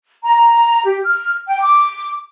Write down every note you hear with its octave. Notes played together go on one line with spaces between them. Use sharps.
A#5
G4
F6
G5
D6